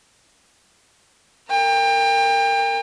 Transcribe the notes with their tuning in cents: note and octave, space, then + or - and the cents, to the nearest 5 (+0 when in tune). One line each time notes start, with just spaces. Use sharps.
A#4 -25 G5 +30